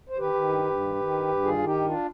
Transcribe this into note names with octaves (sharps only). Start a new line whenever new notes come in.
C5
D#3 G4 B4
D#3
G2
G2
D#3
D#3
G2
G2
D#3 F4 G#4
D#3
D#4 G4
G2 D#4
D4 F4